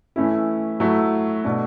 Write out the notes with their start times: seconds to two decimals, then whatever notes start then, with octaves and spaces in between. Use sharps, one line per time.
0.16 E3 A3 C#4 E4
0.80 F#3 A3 E4
1.44 B2 A3 D4